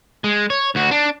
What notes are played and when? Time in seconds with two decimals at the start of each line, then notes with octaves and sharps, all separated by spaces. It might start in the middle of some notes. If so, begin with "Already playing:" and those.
0.24 G#3
0.50 C#5
0.75 D2 F#4
0.91 D4